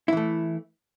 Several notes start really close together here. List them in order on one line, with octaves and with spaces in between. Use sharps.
E4 E3 A3